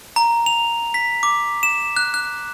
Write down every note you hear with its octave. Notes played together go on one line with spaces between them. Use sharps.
A#5
F7
B6
D6
E7
F#6
F#6